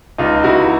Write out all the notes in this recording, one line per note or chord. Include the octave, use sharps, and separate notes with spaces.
C#2 D#4 F4
C#2 E4 F#4